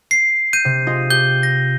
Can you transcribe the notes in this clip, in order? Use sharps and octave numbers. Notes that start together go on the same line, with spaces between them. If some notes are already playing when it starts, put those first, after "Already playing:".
C7
G6 D#7
C3
F4 G#4 D#5
G4 G6 G7
A#6